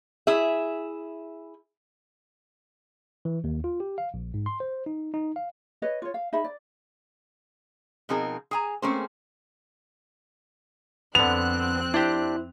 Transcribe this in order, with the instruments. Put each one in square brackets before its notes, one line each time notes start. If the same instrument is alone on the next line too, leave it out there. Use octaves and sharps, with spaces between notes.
[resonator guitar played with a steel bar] E4 G#4 E5
[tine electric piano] E3
D#2
F4
G4
F5
A#1
G#2
C6
C5
D#4
D#4
F5
[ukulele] B4 C#5 D#5
F4 C#5
F5
D#4 G#4 E5 B5
D5
[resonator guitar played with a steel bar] B2 F3 C4 D#4 G#4 A#4
G#4 G#5 A#5
A3 A#3 C4 C#4 G#4 C5
[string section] F2 C4 F#6 [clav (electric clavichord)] D3 B3 [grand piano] F7
[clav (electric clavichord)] D4 G4 [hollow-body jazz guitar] E4 C5